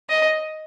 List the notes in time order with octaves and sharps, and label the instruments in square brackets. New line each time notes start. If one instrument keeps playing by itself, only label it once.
[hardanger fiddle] D#5